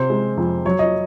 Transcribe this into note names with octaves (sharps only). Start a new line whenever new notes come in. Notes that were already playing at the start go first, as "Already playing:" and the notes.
Already playing: C3 C5
G#3
F2
F#3 C#5
D#5